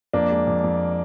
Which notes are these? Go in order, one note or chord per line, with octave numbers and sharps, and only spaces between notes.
F2 A#3 D4
G#3
F2
F2